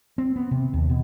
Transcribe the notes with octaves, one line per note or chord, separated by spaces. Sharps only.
C4
B3
C3
D#2
B2